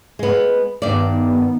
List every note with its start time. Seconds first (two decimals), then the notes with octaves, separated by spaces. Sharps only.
0.19 G#3 B3
0.82 G2 D#3 B3 D5